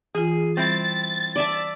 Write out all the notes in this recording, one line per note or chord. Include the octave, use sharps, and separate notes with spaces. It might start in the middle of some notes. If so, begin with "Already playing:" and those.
E3 F4 G#4
G3 C4 E4 A6
D5 E5 A5